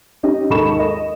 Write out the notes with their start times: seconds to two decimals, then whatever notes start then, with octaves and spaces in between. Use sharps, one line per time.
0.23 C#4 D#4 G4 D#5
0.50 D#2 G#2 A4 B5 C#6 E7
0.79 D#5